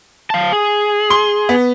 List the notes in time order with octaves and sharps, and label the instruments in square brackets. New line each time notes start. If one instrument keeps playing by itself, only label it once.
[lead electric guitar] F5 A5
G#4
[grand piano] C6 G7
B3